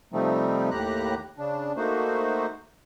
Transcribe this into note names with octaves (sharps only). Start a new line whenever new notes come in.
C3 F3 G3 A3 C4 D#4
D#2 A2 G4 A#5 F#6
C#3 D4
A3 A#3 D#4 F#4 C5